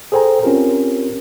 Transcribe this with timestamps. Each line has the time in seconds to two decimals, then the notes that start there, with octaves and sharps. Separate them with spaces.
0.12 G#4 A4 C5 G5 G#5 A#5
0.43 C4 C#4 F4 G4 A#4